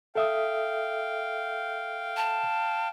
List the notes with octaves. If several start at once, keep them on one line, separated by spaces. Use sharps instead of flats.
A4 E5 F5 G5 D#6
A5